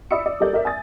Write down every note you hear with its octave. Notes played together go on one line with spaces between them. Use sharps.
D5 E5 B5 D#6 E6 C#7
D5
G3 G4 A4 A#4 D5 G6
A#4 D5 E5
G#5 D#6 A6